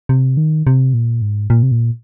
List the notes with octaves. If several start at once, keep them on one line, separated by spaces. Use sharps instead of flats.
C3
D#3
C3
A#2
G#2
A#2
C3
A#2